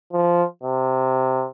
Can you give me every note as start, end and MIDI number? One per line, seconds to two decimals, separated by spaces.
0.13 0.43 53
0.63 1.47 48